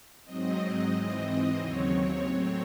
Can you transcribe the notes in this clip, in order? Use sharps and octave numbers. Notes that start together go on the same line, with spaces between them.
G#2 F#3 C4 D#5
G#2 E3 C4
D#2 C#3 F#3 C4 C#5
A2 F#3 C4